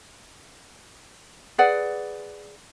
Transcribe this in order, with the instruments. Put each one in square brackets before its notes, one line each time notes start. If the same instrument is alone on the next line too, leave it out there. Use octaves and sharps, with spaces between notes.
[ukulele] G#4 B4 D5 F#5